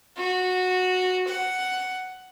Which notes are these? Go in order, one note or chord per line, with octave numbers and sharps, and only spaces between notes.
F#4
F#5